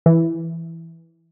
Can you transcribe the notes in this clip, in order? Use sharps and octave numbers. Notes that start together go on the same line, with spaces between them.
E3